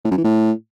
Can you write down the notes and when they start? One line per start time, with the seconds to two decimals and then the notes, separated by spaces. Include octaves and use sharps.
0.05 A2
0.11 F#2
0.18 E3
0.24 A2